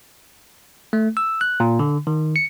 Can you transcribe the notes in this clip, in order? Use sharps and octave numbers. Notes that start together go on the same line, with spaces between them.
A3
E6
F#6
A#2
D3
D#3
C#7